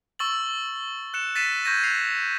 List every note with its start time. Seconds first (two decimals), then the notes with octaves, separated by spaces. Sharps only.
0.19 C#6 E6 A6 F#7
1.14 F#6 C#7 E7
1.35 A6 B6 C7 D#7 E7
1.65 C#6 G6 G#6 A#6 D#7
1.84 C7 F7